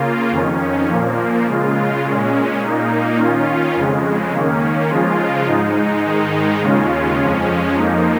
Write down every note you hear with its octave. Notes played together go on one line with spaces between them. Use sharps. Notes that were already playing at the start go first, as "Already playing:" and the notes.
Already playing: C#3 A#3 F4
F2 D#3 C#4
A#2 F3 A#3
C#3 G#3 F4
A#2 G#3 C#4
A#2 A#3 D#4
D#3 C#4 F4
F2 C#3 G#3
D#3 A#3 C#4
C#3 F3 G#3 F4
G#2 G#3 D#4
G#2 D#3 G#3 D#4
D#2 C#3 G#3 C#4 F4
F2 F3 G#3 C#4
F2 F3 A#3 D#4